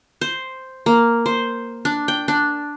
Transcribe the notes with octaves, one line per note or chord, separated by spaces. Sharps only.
C5
A#3
C5
D4
G5
D4